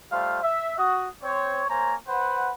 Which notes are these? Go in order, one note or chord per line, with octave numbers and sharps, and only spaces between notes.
G3 A3 F4 C5 F5
E5
F#4 D#6
C4 C5 C#5
A#3 C5 C#5 G#5 A#5
B4 C5 F#5